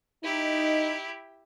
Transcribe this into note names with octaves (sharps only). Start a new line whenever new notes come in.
D#4 E4 G4